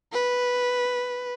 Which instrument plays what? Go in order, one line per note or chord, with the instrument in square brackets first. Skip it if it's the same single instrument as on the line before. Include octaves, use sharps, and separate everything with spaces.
[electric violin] B4